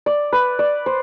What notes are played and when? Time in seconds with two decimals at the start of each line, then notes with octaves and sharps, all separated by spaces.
0.06 D5
0.33 B4
0.59 D5
0.86 C5